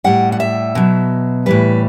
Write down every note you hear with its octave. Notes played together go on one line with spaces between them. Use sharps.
A2 G3 F#5
F#5
E5
B2 F#3
A2 E3 G3 B4